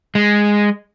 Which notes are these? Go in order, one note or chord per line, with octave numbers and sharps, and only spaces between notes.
G#3